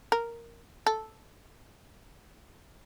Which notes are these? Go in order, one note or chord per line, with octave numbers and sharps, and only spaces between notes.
A#4
A4